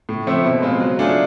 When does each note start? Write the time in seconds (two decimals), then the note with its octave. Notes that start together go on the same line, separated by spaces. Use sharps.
0.09 A2
0.27 F3 A3 C4 E4
0.45 B2
0.62 G#3 C4 F4
0.80 F#3
0.99 A3 D4 F4 G#4